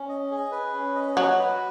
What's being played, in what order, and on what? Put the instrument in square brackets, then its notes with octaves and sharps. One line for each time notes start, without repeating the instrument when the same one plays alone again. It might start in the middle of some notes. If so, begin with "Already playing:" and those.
Already playing: [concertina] C#4
D#5
G#4
B4
C#4
D#5
[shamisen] F#3 [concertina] F#4
[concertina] B4